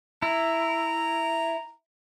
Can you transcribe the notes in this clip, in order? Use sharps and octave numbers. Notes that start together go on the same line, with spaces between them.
E4 A#5